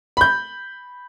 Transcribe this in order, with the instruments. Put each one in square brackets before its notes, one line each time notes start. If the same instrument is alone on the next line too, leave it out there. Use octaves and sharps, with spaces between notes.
[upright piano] B5 G6